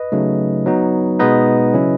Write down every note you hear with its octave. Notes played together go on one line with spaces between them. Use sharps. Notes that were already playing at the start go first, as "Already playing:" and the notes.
Already playing: B4 D#5
C#3 F#3 A3 D#4
F#3 B3 D#4
B2 G#3 B3 D#4 B4 D#5
C#3 F#3 C#4 E4